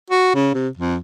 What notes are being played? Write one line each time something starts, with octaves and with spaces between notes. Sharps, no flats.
F#4
C#3
C3
F2